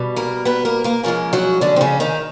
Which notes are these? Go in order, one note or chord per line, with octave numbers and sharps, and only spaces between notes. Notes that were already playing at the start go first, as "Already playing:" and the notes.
Already playing: B2 G3
A#3 A#4
B3 B4
A#3 A#4
A#3 A#4
C#3 F3 G#3 A#3 A#4
F#3 F#4
D3 D4
C4
C#3 C#4
D#3 D#4